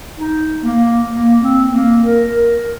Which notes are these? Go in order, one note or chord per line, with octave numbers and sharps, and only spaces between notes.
D#4
A#3
A#3
C4
A#3
A#4
A#4